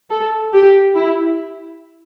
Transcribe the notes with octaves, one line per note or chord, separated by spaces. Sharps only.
A4
G4
E4